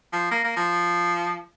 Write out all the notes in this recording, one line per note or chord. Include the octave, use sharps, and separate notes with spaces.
F3
A#3
A#3
F3